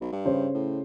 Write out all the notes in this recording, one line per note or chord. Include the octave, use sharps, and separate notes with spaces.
B1
G2
C#3 C5 C#5
A2